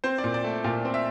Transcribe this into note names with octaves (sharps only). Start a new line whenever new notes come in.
C4 C5
D5
A#2
D5
A3
A#2 F4
C4
E5